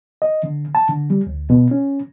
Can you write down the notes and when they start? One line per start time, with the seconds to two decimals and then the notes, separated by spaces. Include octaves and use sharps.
0.22 D#5
0.43 D3
0.75 A5
0.89 D3
1.10 G3
1.27 D2
1.50 B2
1.71 C#4